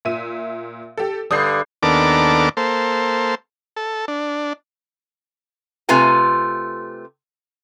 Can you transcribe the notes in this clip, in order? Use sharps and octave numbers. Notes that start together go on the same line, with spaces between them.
A#2 E5 D#7
G4 A4
G2 D3 D#6 G6 C7
D#2 B3 D4 A4 A#4 D6
A#3 A4 C5
A4
D4
C3 A3 F4 B4 G#5 A#5